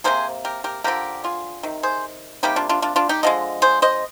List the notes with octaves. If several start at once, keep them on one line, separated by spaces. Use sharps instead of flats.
C3 G3 A#3 G#4 C5
G4 A#4
G4 A#4
D3 F3 A#3 G4 A#4
F4 G#4
C3 D#3
G#4 C5
C3 G3 A#3 D#4 G4
D4 F4
D4 F4
D4 F4
D4 F4
D#4 G4
D3 F3 G#3 D#5
G#4 C5
C5 D#5